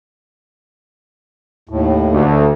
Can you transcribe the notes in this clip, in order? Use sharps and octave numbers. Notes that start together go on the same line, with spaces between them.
D#2 A2
D2